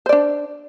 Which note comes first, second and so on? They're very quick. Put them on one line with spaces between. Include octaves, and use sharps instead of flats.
C5 D5 D4